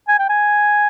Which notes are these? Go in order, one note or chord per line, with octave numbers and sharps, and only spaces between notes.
G#5
G5
G#5